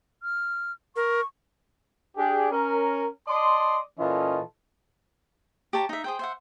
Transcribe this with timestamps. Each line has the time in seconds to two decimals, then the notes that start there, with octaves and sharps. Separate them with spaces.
0.23 F6
0.96 A#4 C#6
2.17 D4 G4 G#4
2.51 C#4 A#4
3.28 D5 D#5 A5 C6
3.99 A#2 E3 C#4 F4 A4 D#5
5.73 G4 C#5 A5 A#5
5.89 D#4 E5
6.04 G#4 C5 G5
6.19 C5 E5 F#5